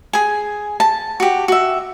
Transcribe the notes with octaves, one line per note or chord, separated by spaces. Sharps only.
G#4 G#5
A5
F#4 G4
F#4 E5